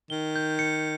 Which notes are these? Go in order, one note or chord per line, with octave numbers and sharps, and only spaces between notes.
D#3 G7
G6
C#7